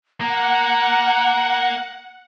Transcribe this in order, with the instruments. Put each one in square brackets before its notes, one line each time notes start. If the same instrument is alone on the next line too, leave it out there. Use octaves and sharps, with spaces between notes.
[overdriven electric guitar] A#3 [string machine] F#5 [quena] A#5